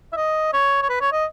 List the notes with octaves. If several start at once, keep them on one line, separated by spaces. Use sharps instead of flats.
E5
D#5
C#5
C#5
B4
C#5
D#5